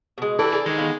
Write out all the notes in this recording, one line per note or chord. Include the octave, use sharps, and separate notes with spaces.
B2 G#3
E3 G4 A4 D5
G#4 A#4 D5
D#3 G#3
B3 F5